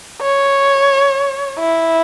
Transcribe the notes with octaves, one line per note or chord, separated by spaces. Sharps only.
C#5
E4